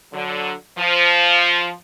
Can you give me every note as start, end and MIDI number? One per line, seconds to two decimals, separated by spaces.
0.13 0.53 50
0.13 0.53 54
0.79 1.73 53